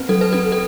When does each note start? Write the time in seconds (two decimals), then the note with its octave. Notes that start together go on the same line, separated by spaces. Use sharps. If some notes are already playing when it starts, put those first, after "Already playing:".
Already playing: C4 B4
0.09 F#3 A4
0.21 B4
0.33 C4 A4
0.52 A4